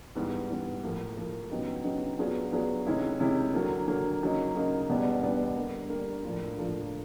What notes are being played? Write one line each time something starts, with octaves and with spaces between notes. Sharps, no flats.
G#2 E3 G3 B3
G#2 E3 G3 B3
A2 F3 A#3
A2 F3 A#3
C#3 F#3 B3 D#4 G4
C#3 F#3 B3 D#4 G4
F#3 B3 D4 F4 G#4
F#3 B3 D4 F4 G#4
C3 D#3 G#3 C#4 E4
C3 D#3 G#3 C#4 E4
D3 F#3 A#3
D3 F#3 A#3
C#3 F#3 A#3 D#4
C#3 F#3 A#3 D#4
E2 B2 G3 B3 D4
E2 B2 G3 B3 D4
D3 G3 A#3
D3 G3 A#3
A2 F3 A#3 D4 F4
A2 F3 A#3 D4 F4